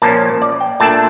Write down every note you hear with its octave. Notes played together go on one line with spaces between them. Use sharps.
A#2 F3 A#3 C#4 A5
D5
G5
A#2 A3 D4 A5